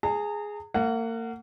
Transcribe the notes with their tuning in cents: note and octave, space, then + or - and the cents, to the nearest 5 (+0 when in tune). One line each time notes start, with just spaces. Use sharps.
G#4 +0 A#5 -40
A#3 -35 F#5 +0